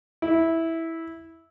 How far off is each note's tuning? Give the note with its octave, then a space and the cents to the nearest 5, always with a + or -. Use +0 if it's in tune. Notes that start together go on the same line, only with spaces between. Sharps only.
E4 -10